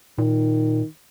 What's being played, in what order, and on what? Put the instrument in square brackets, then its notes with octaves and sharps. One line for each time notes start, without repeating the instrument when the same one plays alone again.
[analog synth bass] A#2 [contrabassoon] D#3